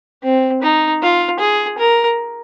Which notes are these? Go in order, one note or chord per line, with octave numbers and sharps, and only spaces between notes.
C4
D#4
F4
G#4
A#4